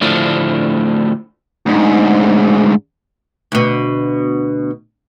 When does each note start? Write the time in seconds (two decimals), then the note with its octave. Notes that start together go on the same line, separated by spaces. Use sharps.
0.01 D2 A2 F3 A3 D4
1.66 D2 G#2
3.52 D2 B2